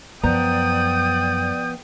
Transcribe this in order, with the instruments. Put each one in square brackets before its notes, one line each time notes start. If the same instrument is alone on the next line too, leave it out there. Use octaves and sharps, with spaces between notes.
[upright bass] F#2 [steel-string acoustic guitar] F3 B3 A#5 [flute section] D5 G6 [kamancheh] G5 D#6